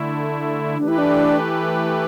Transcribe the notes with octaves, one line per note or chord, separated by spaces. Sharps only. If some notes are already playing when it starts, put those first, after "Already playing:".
Already playing: D3 A3 E4
E3 A3 D4 G4 B4
E4
D4